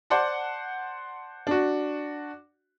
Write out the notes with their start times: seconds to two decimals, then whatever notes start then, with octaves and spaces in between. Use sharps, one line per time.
0.10 C5 D5 F#5 A5
1.47 D4 F#4